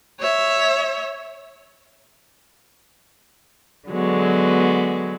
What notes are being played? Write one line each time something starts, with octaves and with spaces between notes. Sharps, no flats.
C#5 E5
D3 F#3 G#3 B3